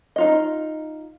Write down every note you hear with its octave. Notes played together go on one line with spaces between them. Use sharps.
D#4 F4 D#5